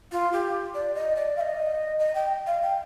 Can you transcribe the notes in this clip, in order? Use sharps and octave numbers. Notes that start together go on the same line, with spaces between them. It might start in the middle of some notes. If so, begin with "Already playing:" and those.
F4
G4
D5
D#5
D5
F5
D#5
D#5
G5
F5
G5